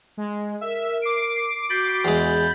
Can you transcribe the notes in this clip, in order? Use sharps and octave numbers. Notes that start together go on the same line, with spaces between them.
G#3
A#4 E5
D6 C7 D7
F#4 B5 G6 A6
E2 G#3